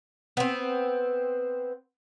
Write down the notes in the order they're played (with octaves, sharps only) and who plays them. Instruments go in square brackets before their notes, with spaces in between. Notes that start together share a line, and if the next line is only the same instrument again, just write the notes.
[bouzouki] B3 C4